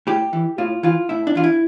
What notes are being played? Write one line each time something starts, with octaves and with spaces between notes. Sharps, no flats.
A2 G4
E3
A2 F4
E3 F4
A2 E4
D4
E3 F4
E4